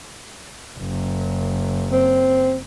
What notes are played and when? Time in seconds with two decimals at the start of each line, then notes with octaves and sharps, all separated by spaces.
0.78 F#1 F#2
1.92 C4